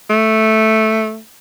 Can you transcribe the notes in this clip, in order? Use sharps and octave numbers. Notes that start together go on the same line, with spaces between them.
A3